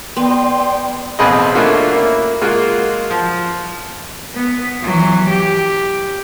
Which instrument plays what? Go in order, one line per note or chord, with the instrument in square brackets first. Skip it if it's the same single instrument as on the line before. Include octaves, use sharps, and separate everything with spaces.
[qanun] B3 [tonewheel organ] D5 G5 C6
[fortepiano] A1 B2 C4 G#4 B4 D#5
A3 A#3 C#4 D4 F4 F#4
A#3 E4
G#3 A#3 F4 F#4
F3
[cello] B3
E3 F#3
G4